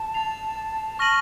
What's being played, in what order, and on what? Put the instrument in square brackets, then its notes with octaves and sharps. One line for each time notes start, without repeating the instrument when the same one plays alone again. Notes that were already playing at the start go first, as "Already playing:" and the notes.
Already playing: [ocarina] A5
[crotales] A6 C7 F7
C#6 F6 A#6 D#7 F#7